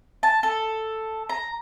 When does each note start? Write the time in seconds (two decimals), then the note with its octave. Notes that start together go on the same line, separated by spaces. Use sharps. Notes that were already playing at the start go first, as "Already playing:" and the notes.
0.23 A5
0.43 A4
1.29 A#5